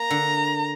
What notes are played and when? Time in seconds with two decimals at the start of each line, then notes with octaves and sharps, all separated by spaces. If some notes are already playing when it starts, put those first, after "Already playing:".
Already playing: A#3 A#5
0.10 D3